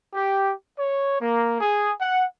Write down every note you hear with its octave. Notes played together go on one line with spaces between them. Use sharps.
G4
C#5
A#3
G#4
F#5